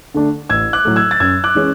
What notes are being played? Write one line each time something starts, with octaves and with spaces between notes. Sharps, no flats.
D3 A3 D4
A1 E6 G#6
D6 F#6
A2 F#3 A3
E6 G#6
A6
F#2 E6 G#6
D6 F#6
E3 G#3 C#4